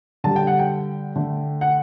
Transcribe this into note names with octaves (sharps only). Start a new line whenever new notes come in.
D3 G3 A5
G5
F#5
G5
D3 A3
F#5